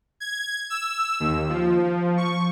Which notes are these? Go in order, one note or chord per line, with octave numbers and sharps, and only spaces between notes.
G#6
E6
D#2
F3
F3
C#6